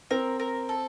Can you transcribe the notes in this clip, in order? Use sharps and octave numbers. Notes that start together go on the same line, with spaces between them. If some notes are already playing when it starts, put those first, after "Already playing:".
C4 A#4
A#4
A4